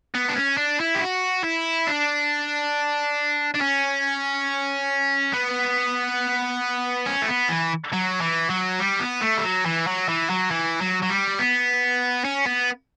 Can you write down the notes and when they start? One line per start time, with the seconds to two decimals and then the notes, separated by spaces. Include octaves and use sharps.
0.15 B3
0.29 D4
0.36 C#4
0.57 D4
0.80 E4
0.94 G4
1.01 F#4
1.44 E4
1.87 D4
3.54 D4
3.61 C#4
5.33 B3
7.06 C#4
7.22 A3
7.28 B3
7.49 E3
7.93 F#3
8.21 E3
8.50 F#3
8.79 G3
9.00 B3
9.21 A3
9.38 G3
9.44 F#3
9.66 E3
9.87 F#3
10.08 E3
10.30 F#3
10.51 E3
10.81 F#3
11.02 F#3
11.10 G3
11.39 B3
12.24 C#4
12.46 B3